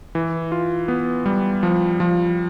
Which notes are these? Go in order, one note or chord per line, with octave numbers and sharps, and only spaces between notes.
E3
F4
B3
G3
F3
F3